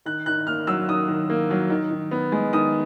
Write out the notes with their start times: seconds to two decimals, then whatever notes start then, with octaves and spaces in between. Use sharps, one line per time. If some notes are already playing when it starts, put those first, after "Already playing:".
0.05 D#3 F#6
0.26 D#3 F#6
0.47 A#3 F6
0.67 F#3 E6
0.88 D#3 D#6
1.08 D#3
1.30 A#3
1.50 F#3
1.70 D#3
1.90 D#3
2.11 B3
2.32 G#3
2.53 D#3 D#6